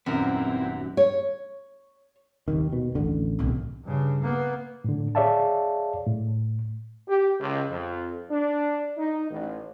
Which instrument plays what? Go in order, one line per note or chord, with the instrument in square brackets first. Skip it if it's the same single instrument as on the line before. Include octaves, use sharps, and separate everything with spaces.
[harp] D#1 [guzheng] F#2 [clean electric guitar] B3 A#4 [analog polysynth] C4 E4
[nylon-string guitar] C#5
[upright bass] D#2 C3 [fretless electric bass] D#3
[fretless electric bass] B2
[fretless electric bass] A1 D3 [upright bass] D#2 E3
[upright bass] C2 B2
[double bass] G2 C#3
A#3 B3
[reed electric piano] A2 D3
G#4 C#5 D5 E5 F5 A5
A2
[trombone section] G4
C#2
F2
D4
D#4
A1